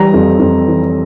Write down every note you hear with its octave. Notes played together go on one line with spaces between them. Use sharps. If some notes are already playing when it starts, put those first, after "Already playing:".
Already playing: E3 G3 A#5
F2
F2
E3